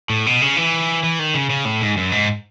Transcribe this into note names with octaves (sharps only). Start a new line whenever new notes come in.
A2
B2
C#3
E3
E3
D#3
C#3
C#3
A2
G#2
F#2
G#2